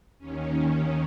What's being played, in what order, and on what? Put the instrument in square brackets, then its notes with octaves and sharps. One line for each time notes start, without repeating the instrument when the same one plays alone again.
[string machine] D#2 D#3 C#4